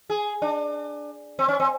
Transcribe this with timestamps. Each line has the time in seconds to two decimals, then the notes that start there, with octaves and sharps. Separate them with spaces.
0.10 G#4
0.42 D4
1.39 C4
1.48 C#4
1.60 C4